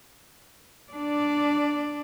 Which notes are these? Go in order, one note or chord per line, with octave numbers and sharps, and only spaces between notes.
D4 D5